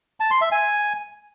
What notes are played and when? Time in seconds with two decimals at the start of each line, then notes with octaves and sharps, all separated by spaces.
0.20 A5
0.31 C6
0.41 E5
0.52 G#5